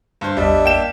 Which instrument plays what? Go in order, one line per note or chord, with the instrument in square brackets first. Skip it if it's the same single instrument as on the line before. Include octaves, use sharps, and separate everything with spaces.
[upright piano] G2 C5
[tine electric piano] A1 E2 D#5 [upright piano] G3 [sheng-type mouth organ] D4 E5
[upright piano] A#3 G5 E7